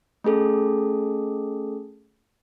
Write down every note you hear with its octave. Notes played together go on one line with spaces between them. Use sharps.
A3 C#4 G#4 A4